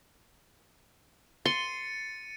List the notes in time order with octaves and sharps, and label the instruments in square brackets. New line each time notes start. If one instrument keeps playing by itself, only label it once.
[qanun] C6 [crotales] A6 C#7 D#7